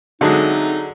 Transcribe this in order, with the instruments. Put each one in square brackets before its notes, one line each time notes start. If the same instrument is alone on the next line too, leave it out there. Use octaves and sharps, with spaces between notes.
[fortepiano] D3 F#3 G#3 [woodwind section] A3 C4 D#4